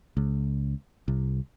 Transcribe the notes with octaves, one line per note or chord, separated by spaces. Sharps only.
C#2
C2